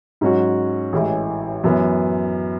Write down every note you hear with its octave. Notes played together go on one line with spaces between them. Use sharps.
G#2 F#3 C#4 F#4
A1 A2 E3 G#3
F#2 E3 B3